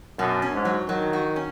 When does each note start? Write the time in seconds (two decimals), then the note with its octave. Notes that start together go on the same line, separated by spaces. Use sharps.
0.19 F#2 B2
0.42 C#4
0.54 G#2
0.65 F#3
0.89 D#3 F#3
1.13 F#4
1.36 C#4